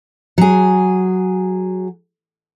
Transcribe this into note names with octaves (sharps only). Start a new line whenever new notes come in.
F#3 G#4